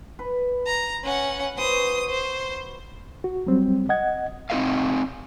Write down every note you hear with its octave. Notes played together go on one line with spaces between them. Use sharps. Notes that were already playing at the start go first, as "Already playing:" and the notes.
B4
A#5
C#4 F#5
F#4 B4 C5 D#6
C5
F#4
F#3 G3 C4
D#5 F#5 G#6
C4 D#4 E4 B4 D#5 F5